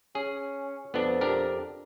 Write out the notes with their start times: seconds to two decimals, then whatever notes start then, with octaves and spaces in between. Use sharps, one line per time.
0.15 C#4 G#4
0.94 F2 B3 D4
1.21 D4 G4 A#4